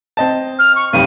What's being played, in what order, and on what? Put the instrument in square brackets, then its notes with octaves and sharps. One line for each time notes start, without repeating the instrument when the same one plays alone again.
[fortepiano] C4 D#5 A5
[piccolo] F6
C#6
[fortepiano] B1 F2 G3 [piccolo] D#7